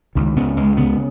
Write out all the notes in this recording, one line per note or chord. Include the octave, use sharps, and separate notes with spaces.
C#2 D#3
C#3 B3
C#2 G#3
C#3 B3